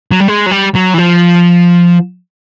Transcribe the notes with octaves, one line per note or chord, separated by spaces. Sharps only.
F#3
G3
G#3
F#3
G3
F#3
E3
F3